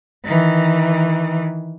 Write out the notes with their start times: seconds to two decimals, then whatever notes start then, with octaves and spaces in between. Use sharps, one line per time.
0.25 D#3 E3